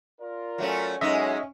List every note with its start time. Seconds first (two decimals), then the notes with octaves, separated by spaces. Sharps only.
0.21 F4 A#4 D5
0.58 F#3 A3 C#4
1.01 F#2 G#3 C#4 D#4 D#5 E5